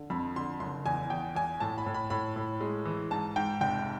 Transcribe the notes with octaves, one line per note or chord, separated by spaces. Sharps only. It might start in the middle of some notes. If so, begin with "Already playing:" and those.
Already playing: D3
F2 B5
D3 C6
F#1 C6
E2 G#5
E2 G5
E2 G#5
A2 A5
B5
A2
B5
A2 B5
A2
G#3
E3
G#2 A5
G#2 G5
F1 G5